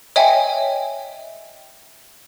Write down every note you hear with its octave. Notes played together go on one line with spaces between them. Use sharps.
C#5 D#5 E5 G5 G#5